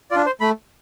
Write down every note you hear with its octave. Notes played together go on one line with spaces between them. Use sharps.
D4 F4 D5
C5
A3 B5